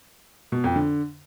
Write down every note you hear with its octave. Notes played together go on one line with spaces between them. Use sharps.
B2
F2
D3